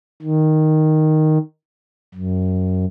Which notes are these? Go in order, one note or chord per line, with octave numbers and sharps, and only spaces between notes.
D#3
F#2